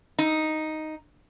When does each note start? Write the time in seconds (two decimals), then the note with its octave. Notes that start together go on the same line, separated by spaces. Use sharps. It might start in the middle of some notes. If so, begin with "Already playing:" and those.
0.19 D#4